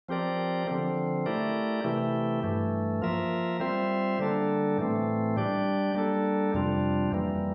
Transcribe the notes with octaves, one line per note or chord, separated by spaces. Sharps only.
F3 C4 G4 A#4 D5
D3 F3 C4
A3 E4 G4 A#4 D5
C3 E3 A3 E4 G4
G2 E3 A3
F3 A#3 F4 A#4 E5
G3 C4 F4 C5 E5
D3 G3 A#3 D4 A4
A2 E3 A3 C4
G3 D4 G4 D5
G3 A#3 D4 A4
F2 C3 G3 D4 F4
F2 E3 G3 A#3